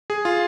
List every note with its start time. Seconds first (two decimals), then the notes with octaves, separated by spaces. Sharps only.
0.10 G#4
0.25 F4